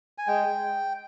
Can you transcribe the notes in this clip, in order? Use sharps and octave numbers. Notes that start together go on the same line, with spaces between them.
G#5
G#3 G5